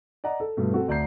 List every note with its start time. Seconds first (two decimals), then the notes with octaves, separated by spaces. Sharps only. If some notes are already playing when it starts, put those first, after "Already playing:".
0.24 D5 D#5 F#5 A#5
0.40 A4
0.57 G2 B2 A3
0.72 C4 F#4 A4
0.88 D2 D5 A#5 G6 C7